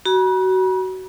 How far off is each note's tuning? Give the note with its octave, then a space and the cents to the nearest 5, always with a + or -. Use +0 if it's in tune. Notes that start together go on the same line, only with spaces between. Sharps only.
F#4 +20 B5 -45